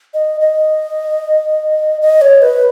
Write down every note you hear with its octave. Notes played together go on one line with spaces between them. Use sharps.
D#5
D#5
D#5
C#5
B4